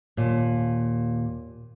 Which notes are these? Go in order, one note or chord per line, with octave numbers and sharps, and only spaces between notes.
D#2 A#2